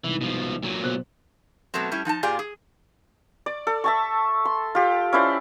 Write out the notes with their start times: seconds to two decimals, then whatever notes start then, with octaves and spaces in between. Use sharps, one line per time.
0.04 C2 G#2 E3
0.21 B2 F3
0.63 A#2 F#3
0.83 B2 C5 F#6
1.74 B2 F#3 A3 B3 C4
1.92 G3 A3 C#4 E4
2.05 F3 D#4 G5 A5
2.23 A#2 F4 G4 G#4 D5 G#5
2.39 G#4
3.46 D5
3.67 A4
3.84 E5 A5 C#6
4.45 C6
4.75 F4 G4
5.13 C#4 E4 C5 D5